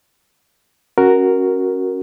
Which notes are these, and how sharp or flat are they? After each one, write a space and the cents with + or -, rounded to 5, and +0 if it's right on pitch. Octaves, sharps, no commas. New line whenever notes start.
C#4 -15 F#4 +0 A#4 +0